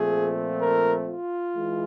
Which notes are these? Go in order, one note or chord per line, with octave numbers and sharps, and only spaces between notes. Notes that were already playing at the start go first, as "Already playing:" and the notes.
Already playing: A#2 F3 A3 C4 G#4
A#4
F4
E3 G#3